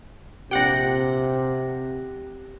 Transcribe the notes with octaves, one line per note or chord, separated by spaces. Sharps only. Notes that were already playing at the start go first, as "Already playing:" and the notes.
A#1 C3 G4 F#5 G5 A#6